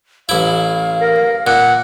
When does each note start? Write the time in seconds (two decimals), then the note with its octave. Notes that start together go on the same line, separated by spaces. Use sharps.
0.29 A1 E4 F5
1.01 A#4
1.47 A#2 F#5